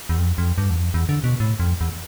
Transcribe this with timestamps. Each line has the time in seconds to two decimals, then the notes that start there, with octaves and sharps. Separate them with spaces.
0.09 E2
0.18 F2
0.38 F2
0.58 G2
0.70 E2
0.79 F2
0.94 E2
1.09 D3
1.24 B2
1.40 A2
1.60 F2
1.81 E2